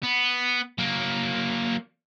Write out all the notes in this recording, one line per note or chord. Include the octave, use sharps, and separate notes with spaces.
B3
F#3 A#3